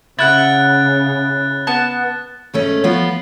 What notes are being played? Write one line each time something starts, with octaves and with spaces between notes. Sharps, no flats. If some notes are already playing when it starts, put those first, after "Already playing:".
C#3 E4 F#5 F#6 A6
B3 A5
G#2 A3 C#4
F3 B3 F4